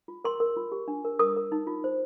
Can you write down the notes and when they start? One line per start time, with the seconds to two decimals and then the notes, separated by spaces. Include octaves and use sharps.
0.08 F4
0.24 A#4 C6
0.40 A#4
0.57 F4
0.72 G4
0.88 D4
1.05 A#4
1.19 A#4 D#6
1.36 A#4
1.52 D#4
1.67 F4
1.84 C5